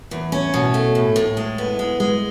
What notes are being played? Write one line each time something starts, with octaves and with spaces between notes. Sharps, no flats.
E2
C#4
B2
A3
A2
A2
G#3
B3
G#3
G#3